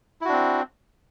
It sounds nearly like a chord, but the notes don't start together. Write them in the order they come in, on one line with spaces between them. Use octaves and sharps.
E4 F#4 D4 C4